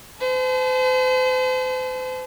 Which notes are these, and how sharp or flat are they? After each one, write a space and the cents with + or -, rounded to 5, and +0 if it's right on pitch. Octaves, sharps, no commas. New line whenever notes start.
C5 -40 A5 -35